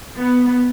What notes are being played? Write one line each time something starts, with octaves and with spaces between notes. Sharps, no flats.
B3